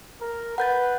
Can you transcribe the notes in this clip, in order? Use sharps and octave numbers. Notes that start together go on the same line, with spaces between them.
A#4
B4 F#5 G6 A6